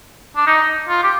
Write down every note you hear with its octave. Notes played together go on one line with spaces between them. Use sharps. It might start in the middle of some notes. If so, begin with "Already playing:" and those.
D4
D#4
F4
G4